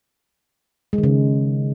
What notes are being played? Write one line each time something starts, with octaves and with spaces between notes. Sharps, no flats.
G#3
D#3
C#3